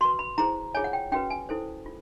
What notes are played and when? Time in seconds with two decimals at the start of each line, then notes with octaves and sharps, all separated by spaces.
0.01 F#4 B4 C6
0.19 B5
0.38 E4 G#4 C5 A#5
0.75 F4 G#4 C#5 G#5
0.84 F#5
0.93 G5
1.12 C#4 F#4 B4 G5
1.30 G#5
1.49 E4 A4 C5
1.86 F4